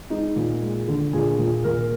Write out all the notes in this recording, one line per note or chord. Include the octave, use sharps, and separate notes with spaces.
G#3 D#4
A#2
G#3
D3
A#2 G#4
A#2
A#2 A#4